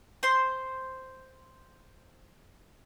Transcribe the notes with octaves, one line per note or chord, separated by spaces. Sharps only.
C5 C6